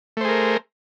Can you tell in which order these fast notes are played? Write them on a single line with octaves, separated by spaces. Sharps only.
A3 C5 G#4 A#4